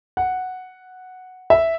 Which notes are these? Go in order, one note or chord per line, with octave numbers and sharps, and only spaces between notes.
F#5
E5